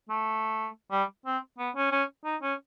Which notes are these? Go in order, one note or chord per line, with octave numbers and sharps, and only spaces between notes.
A3
G3
C4
B3
C#4
C#4
D#4
C#4